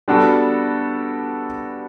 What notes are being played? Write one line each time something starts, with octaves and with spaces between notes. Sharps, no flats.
G3 B3 D4 F#4 A4